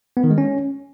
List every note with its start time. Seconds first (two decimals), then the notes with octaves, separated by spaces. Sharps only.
0.17 B3
0.24 D#3
0.31 G#3
0.38 C#4